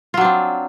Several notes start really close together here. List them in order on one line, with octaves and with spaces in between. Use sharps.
F4 F#3 D4 C4